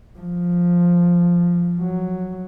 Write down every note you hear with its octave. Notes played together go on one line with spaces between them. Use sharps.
F3
F#3